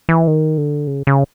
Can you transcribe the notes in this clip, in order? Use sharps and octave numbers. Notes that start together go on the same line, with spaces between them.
E3
D#3
D3
C#3
C#3